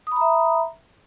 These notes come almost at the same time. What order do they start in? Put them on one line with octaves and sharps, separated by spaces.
D#6 B5 A#5 E5